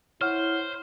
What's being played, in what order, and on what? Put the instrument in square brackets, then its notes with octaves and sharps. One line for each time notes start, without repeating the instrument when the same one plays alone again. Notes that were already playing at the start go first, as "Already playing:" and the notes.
[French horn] E4 [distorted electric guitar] C5 [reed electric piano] C#5 F#5 [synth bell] F6